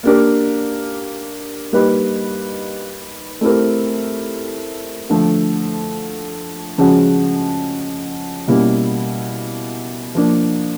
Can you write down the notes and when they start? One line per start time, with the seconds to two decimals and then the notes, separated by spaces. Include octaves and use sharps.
0.03 A#3 D4 G4 A#4
1.73 G3 A#3 D#4 G4 B4
3.41 A3 C4 E4 G4 A#4
5.09 D3 F3 A3
6.78 C#3 F3 G#3 C#4 F#4
8.48 B2 G3 A#3 C#4 E4
10.15 F3 A#3 D4